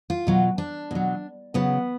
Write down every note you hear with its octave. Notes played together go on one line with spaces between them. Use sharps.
F4
B2 F#3
D4
B2 F#3
C#3 F#3 B3